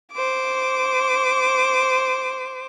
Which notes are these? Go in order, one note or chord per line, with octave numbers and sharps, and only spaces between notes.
C5 D6